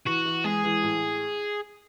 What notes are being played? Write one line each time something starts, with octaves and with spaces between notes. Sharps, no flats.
E3 F#4
E3
G#3 G#4
E3
A2